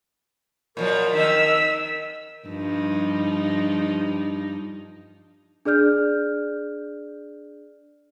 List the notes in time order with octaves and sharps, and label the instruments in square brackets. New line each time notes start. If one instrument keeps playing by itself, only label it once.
[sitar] A#2 F3 F#3 [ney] A#4
[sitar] D#3 [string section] E6 B6
[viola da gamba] G2 F3 D#4
[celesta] D4 G#4 D5 F6 G6